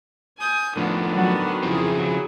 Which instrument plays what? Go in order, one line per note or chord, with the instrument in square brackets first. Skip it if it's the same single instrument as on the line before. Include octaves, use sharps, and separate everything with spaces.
[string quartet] G#5 D#6 G6
[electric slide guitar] A2 F3 [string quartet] D3 D#3 B3
[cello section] F#3 F#4
[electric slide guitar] C#3 F3 C4 [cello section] E4 G#4
[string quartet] F#3